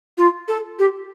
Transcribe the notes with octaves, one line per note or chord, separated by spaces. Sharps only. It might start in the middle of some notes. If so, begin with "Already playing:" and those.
F4
A4
G4